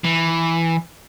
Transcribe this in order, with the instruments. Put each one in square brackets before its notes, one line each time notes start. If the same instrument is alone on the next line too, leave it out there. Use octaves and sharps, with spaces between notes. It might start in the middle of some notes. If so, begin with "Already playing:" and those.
[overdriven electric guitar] E3